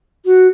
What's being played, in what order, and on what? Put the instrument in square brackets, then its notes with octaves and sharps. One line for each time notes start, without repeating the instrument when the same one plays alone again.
[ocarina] F#4